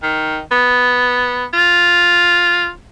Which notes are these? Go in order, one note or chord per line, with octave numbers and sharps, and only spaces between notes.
D#3
B3
F4